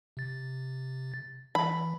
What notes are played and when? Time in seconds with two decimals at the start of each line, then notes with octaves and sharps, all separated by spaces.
0.17 C3 A6
1.55 E3 B5